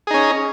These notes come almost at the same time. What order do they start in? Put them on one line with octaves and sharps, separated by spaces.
G#4 D#4 C#4